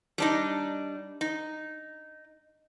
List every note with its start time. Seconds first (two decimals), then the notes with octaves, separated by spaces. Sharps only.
0.18 G3 D4 D#4
1.21 D#4